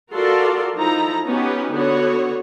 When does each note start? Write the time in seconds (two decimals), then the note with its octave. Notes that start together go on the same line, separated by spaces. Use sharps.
0.13 F4 F#4 A4 A#4 D5 C6
0.76 F3 D#4 E4 A4 A#5
1.27 B3 C#4 D#4 F#4 G4 B4
1.73 D3 B3 F#4 C#5